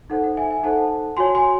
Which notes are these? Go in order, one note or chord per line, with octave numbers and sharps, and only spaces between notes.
D#4 A4 C5 F#5
F#5
E5 G#5
E5 G#5
D#4 A4 C5 F#5 A5
F#4 C#5 G#5 C6
G#5 C6